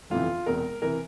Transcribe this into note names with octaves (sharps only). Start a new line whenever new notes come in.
G1 F2 C3 E3 F4
E1 E2 C3 A#4
C3 E3 A#4